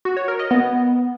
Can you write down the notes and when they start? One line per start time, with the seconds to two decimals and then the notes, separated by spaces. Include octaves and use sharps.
0.05 F#4
0.17 C#5
0.28 A#4
0.39 D#5
0.51 B3